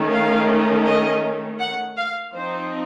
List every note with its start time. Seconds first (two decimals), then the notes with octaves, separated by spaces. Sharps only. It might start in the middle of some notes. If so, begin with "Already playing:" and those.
Already playing: D#3 A3 C#4
0.12 F5
0.86 D#5
1.60 F#5
1.97 F5
2.34 F3 C4 D#4 C5